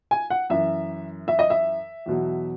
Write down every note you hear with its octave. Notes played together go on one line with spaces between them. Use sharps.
G#5
F#5
F#2 E3 E5
E5
D#5
E5
E2 B2 F#3